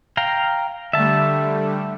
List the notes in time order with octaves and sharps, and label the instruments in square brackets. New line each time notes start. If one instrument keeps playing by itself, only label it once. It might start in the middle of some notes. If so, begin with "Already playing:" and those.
[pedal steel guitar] F5 G5 A#5
[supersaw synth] D3 G3 A3 [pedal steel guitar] E5 A5